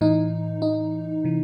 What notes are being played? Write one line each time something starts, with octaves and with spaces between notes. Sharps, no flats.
A2 E3 D#4
D#4
C3 E3